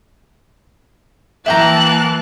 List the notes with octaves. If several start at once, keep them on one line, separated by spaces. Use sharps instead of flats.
E3 A#3 E5 G5 A5 A#5 F#6